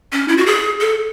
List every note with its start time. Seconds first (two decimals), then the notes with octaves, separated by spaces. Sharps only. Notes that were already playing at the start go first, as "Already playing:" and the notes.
0.12 C#4
0.28 E4
0.37 F#4
0.46 G#4
0.80 A4